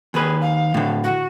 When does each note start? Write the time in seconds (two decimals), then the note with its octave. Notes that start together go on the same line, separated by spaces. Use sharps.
0.14 D#2 G#4 B4
0.41 F5
0.74 A2 D3
1.03 F#4